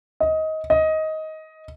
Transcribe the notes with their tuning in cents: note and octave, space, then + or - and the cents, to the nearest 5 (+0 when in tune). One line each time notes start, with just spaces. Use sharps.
D#5 +20
D#5 +15